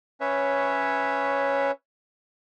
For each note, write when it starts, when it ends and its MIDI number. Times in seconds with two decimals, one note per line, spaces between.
0.20 1.71 61
0.20 1.71 71
0.20 1.71 73
0.20 1.71 76